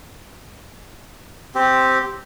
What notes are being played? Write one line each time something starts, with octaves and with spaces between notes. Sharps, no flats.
C4 G4